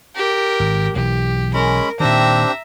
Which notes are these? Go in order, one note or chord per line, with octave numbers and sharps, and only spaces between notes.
G4 A#4
G#1
B1 E3 G4
G#3 C#4 A#4 B5
A#2 D#3 C4 D4 G4 E5 A#5